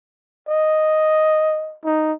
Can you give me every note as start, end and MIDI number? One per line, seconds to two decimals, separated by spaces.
0.48 1.76 75
1.84 2.13 63